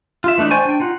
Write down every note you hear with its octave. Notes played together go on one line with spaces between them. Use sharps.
F4 E5
E3 A3 D4 D#4
C5 D5 G5 G#5 C#6
D4 G5
D#4 F4 F#5